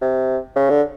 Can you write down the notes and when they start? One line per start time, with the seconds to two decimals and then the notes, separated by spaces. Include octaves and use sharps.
0.02 C3
0.56 C#3
0.70 D3